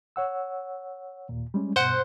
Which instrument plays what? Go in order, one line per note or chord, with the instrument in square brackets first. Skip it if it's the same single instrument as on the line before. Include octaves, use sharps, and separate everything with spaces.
[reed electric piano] C#5 F#5 E6
D#2 A#2
G3 G#3 C#4
[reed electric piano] G2 B2 [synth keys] C5 F#5